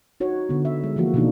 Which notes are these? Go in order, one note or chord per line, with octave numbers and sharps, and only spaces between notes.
D#4 F#4 C#5
D3 B3
E5
G#3
E3 F3 A#3 F#4
B2 D#3 A#3 D4 D#4